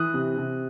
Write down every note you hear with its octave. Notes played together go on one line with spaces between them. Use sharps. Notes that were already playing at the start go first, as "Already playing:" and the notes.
Already playing: E3 D#6 F#6
C3
C3